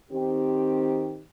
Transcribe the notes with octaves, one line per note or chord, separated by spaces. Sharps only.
D#3 C4 G4